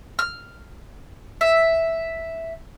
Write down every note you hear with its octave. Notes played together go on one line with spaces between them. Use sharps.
F6
E5